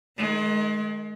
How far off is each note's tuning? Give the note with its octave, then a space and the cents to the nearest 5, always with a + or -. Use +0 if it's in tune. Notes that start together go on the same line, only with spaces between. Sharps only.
D#3 +0 G#3 +35